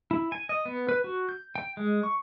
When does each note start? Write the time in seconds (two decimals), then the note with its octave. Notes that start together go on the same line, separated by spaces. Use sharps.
0.11 E4
0.32 G#5
0.49 D#5
0.65 B3
0.89 B4
1.04 F#4
1.29 G6
1.56 G5
1.77 G#3
2.03 C#6